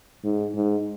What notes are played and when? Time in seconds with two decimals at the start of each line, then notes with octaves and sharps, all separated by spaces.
0.24 G#2
0.55 G#2